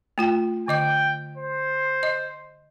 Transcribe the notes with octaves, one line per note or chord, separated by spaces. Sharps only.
A3 F4 G5
D3 D#5 G5 D6
C5
D#5